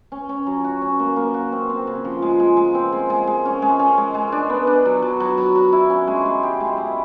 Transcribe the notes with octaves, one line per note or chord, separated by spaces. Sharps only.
C#4
C#4
F#3
F#4
C#4
A#3
A#3
F#4
C4
C4
C#3
F3
G#3
G#3
G#3
C4
G#3
G#3
G#3
C#4
G#3
C#4
G#3
G#3
D4
B3
D4
F#3
F#3
F#3
F#3
F#3
E4
C#4
G#3
G#3
G4
G#3
E4